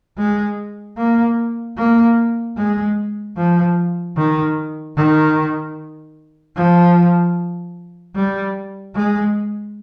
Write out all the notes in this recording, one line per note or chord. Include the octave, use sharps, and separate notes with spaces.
G#3
A#3
A#3
G#3
F3
D#3
D#3
F3
G3
G#3